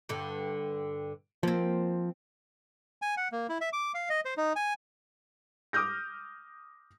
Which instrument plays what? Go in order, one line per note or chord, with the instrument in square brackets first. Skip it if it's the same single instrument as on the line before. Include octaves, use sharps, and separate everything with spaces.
[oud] G2 D3
[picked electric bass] F3 [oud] A#3 C4
[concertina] G#5
F#5
A#3
E4
E5
D6
F5
D#5
C5
D#4
G#5
[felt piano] D6 D#6 F6 G6 A#6